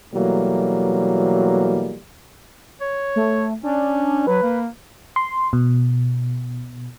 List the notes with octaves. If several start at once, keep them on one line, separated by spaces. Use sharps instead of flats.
B2 E3 F#3 G3 A3 A#3
C#5
A3
C#4 D4
F#3 B4
A#3
C6
B2